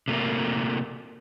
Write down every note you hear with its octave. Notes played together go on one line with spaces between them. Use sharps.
C3 A3 A#3